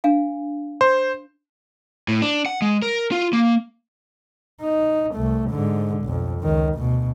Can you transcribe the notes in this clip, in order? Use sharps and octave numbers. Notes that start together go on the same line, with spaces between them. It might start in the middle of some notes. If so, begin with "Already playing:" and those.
D4 F5 G#5
C5
A2
D4
F#5
G#3
A#4
F4
A#3
D#4
C2 A3
G#2 D3
B1 F2
C#2 D#3
D2 B2